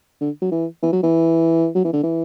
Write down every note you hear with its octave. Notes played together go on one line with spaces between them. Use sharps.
D3
F#3
E3
E3
F#3
E3
F#3
E3
D3
E3